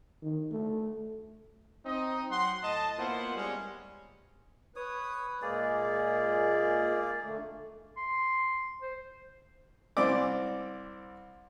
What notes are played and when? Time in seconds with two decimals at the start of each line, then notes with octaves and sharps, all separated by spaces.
0.22 D#3
0.51 A3
1.85 C4 D#4 D#5
2.31 F#3 F#5 C6
2.63 A2 D#5 A5
2.98 A#3 B3 E4 F4 C5 F#5
3.36 G3 G#3 C#4
4.76 B4 C#5 D#6
5.42 A#2 G#3 A#3 G#4 D5
7.22 D3 A3
7.97 C6
8.82 C5
9.97 C2 C4 D5 D6